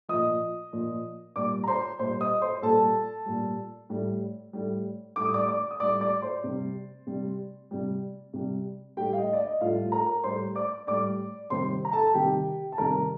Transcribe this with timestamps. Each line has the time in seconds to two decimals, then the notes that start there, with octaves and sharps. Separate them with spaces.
0.09 A#2 F3 D#5 D#6
0.73 A#2 F3
1.36 A#2 G3 D5 D6
1.64 A#5
1.68 C5 C6
1.99 A#2 G3 C5 C6
2.20 D#5 D#6
2.41 C5 C6
2.62 A#2 G3 A4 A5
3.26 A#2 G3
3.90 A2 G3
4.53 A2 G3
5.16 A2 G3 D6
5.25 D#6
5.34 D5 D6
5.48 D5 D6
5.71 D#6
5.80 A2 G3 D5 D6
6.01 D5 D6
6.22 C5 C6
6.44 C3 G3
7.07 C3 G3
7.71 C3 G3
8.33 C3 G3
8.97 A2 G3 G4 G5
9.13 F5
9.18 D#5
9.33 D5
9.40 D#5
9.61 A2 G3 F4 F5
9.92 A#4 A#5
10.24 A2 G3 C5 C6
10.55 D5 D6
10.87 A2 G3 D5 D6
11.50 C3 D#3 G3 C5 C6
11.85 A#5
11.93 A4 A5
12.14 C3 D#3 G3 G4 G5
12.72 A5
12.78 C3 D#3 G3 A#4 A#5